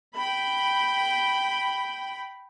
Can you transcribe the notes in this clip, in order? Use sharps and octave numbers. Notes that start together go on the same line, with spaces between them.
G5 B5